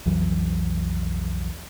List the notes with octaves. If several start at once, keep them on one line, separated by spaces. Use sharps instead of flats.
B1 F2 E3 F#3